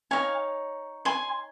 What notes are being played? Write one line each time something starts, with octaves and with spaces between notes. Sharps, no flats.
D#4 G4 C#5 F5 G#5
G#5 C6